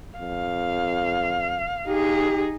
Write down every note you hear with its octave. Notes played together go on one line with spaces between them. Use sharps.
F2 F5
D#4 G4 G#4